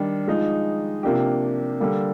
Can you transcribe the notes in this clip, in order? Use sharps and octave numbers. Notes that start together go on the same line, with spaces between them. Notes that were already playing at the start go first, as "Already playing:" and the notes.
Already playing: D#3 G3 D4
F3 G#3 D#4
C3 F3 A#3 D4 G4
D3 G3 A#3